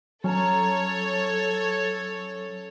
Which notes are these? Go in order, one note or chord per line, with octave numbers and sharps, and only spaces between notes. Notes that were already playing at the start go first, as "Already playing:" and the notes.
F#3 C#4 A4 C#5 A5 A#5